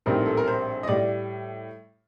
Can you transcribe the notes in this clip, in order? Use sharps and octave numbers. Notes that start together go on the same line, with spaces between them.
A#1 A2 G3 C4 D#4 A#4
A4
A#4
C5
D#5
A2 G3 D5